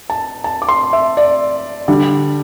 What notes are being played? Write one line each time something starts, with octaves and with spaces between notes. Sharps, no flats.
A5
A5
D6
C6
E5
D5
D3 G3 D4